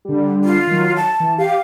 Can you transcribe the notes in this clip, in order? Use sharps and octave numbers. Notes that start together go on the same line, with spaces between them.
D3 G3
F4
D#3 F#3
A5
E3
G4 F5